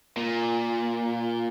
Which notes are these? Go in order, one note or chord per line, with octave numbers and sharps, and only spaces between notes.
A#2